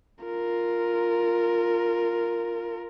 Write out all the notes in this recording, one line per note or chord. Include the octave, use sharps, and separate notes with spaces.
F4 A#4